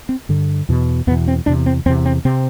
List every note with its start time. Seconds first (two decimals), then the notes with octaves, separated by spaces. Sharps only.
0.09 C4
0.29 G2 D3
0.69 E2 B2
1.07 E2 B3
1.10 B2
1.28 C4
1.46 E2 C3 D4
1.66 C4
1.86 E2 C4
1.89 C3
2.06 C4
2.25 C3 C4